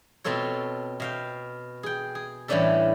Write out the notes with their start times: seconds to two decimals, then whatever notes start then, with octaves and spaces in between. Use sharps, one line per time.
0.24 B2 C4 F4 A4 C#5
1.00 B2 F5 G5
1.83 G#4 G5
2.15 G#4
2.48 A2 E3 G3 C#4 D4 A4